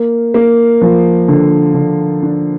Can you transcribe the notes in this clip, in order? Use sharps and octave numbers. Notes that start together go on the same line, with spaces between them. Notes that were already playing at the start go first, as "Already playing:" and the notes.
Already playing: A#3
A#3
F3
D3
D3
D4